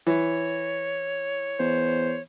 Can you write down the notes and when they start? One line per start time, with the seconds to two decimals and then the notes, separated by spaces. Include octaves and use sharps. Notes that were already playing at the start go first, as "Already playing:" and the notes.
0.07 E3 C#5
1.59 E2 C5